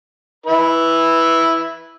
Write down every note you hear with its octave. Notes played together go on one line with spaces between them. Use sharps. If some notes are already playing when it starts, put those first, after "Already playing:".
E4 B4